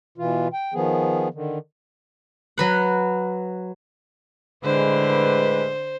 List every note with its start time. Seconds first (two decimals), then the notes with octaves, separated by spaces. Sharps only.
0.18 B2 E3 F4
0.53 G5
0.74 D#3 F3 B3 G#4
1.34 D3 D#3
2.58 F#3 B4 F#5
4.64 A2 D3 G#3 B4 C5